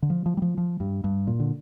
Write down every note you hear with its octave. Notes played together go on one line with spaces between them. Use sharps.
D3
F3
F3
G3
F3
F3
G2
G2
A#2
D3